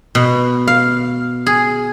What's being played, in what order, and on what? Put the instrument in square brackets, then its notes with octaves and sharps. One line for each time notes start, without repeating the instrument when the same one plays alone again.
[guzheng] B2
F5
G#4